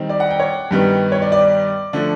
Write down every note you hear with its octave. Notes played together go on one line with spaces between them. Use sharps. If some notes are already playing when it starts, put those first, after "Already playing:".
Already playing: D#3 G3 C4 D#4
D5
F#5
G5
C#5
G2 D#3 G3 B3
C#5
D5
D5
D3 F3 A3 D4